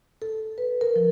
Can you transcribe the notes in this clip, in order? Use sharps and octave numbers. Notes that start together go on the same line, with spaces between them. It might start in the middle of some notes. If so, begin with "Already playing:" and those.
A4
B4
A#4
F3